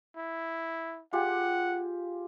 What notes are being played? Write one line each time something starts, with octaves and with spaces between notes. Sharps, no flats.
E4
F4 G4 G#4 F#5